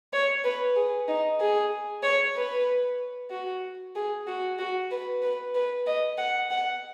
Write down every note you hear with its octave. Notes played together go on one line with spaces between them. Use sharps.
C#5
B4
G#4
D#4
G#4
C#5
B4
F#4
G#4
F#4
F#4
B4
B4
B4
D#5
F#5
F#5